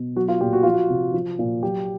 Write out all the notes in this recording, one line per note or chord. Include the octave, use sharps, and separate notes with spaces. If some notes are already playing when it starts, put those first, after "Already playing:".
Already playing: B2
F#3 F#4
F4
A#2 G4
F#4
F3 F4
F#4
C3
F3
A#2
F#3 G4